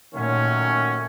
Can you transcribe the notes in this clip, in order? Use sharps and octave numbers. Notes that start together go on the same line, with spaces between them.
A#2 D#3 F#3 A3 C#4